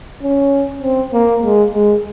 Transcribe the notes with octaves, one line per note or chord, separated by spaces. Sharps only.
C#4
C4
A#3
G#3
G#3